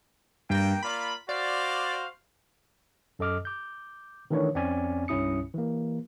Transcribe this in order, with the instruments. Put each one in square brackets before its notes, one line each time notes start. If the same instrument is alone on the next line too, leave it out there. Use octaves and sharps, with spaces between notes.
[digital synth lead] G2 [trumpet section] A#3 G5
[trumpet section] A#3 F4 D5 [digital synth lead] B5
[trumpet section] F#4 C5 F5 [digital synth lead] D5
[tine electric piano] F#2 A4 D#5 D6 F6
D6 G6
D#3 E3 A3 D4 B4 C#5
F2 C4 C#4 D5 G#5
C2 G2 C#4 E4 D#6 C#7
E3 A#3